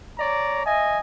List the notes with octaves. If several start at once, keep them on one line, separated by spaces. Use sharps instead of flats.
C#5 D5 A#5
D#5 E5 G#5